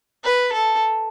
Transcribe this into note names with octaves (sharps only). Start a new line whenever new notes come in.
B4
A4